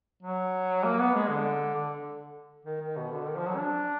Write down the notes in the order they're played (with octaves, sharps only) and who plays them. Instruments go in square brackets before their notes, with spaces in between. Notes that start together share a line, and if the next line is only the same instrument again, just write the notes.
[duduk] F#3
A#3
B3
G#3
D3
D3
D#3
D#3
B2
D3
D#3
F3
F#3
D4